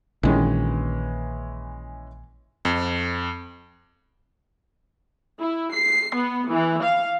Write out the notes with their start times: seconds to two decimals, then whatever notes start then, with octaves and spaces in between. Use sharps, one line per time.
0.23 A#1 D#3 E3 G#3 C#4
2.65 F2
5.40 E4
5.74 C7
6.14 B3
6.51 E3
6.82 F5